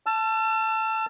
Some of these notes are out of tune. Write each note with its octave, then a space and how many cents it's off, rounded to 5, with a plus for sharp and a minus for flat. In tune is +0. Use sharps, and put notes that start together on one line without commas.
A5 +0 E6 +45